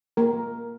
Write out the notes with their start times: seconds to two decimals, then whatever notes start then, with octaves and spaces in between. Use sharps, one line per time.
0.17 A#3 A#4